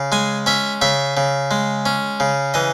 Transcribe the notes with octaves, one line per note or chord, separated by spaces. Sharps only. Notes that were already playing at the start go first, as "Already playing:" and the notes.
Already playing: C#3
G#3 G#5
C#4 E5
C#3 E5
C#3
G#3
C#4
C#3
E3 D#5